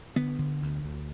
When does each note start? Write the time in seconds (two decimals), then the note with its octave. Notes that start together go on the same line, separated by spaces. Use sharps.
0.16 D3 B3
0.39 D3
0.62 D2
0.85 D2